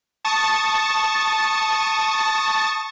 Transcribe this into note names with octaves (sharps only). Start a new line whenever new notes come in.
A5 C#6 D#6 A6